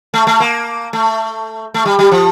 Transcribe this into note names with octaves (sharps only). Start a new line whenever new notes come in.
A3
A3
A#3
A3
A3
G3
G3
F3